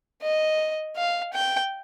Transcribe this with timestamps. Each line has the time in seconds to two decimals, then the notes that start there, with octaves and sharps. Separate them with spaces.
0.22 D#5
0.96 F5
1.33 G5